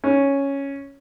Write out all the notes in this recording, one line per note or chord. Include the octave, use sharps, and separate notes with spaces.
C#4